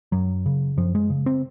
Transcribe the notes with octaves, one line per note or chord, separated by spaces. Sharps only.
F#2 F#3
C#3
F#2 F3
G#3
C#3
C4